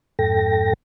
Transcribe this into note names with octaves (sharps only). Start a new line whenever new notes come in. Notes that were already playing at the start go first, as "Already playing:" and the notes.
F2 G#2 A4 G5 A#6